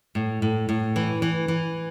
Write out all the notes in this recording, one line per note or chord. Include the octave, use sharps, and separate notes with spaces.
A2
A2
A2
E3
E3
E3